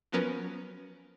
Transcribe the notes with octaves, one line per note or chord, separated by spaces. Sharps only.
F3 F#3 B3 C#4 A#4 B4